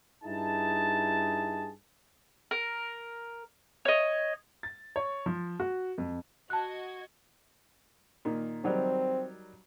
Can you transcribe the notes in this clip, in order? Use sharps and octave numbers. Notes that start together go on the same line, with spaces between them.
G2 D#4 E4 G#4 A5
A#4
C#5 D#5
A6
C#5
F3
F#4
F2
F#4 D#5 A5 F#6 G#6
A#2 D#3
D#3 F#3 G3 C4